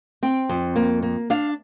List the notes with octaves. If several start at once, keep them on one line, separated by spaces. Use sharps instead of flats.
C4 G5
F2
A#3
A#3
D4 F5